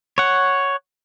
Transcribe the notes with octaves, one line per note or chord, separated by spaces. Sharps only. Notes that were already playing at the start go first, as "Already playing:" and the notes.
C#5 F#5